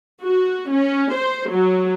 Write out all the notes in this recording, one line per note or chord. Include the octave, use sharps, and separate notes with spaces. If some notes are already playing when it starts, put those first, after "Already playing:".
F#4
C#4
C5
F#3